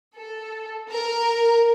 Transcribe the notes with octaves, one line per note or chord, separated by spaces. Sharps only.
A4
A#4